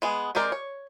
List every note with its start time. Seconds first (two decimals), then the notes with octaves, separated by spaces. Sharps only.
0.02 G#3 B3 G#4
0.35 G#3 C4 G4 A#4 D5
0.52 C#5